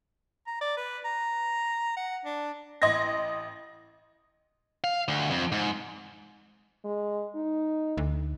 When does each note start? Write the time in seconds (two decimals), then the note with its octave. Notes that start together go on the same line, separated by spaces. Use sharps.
0.47 A#5
0.61 D5
0.77 B4
1.05 A#5
1.97 F#5
2.25 D4
2.82 A1 D#5 C6 G#6 A#6
4.84 F5
5.08 D2
5.31 F2
5.52 G#2
6.84 G#3
7.35 D#4
7.97 D2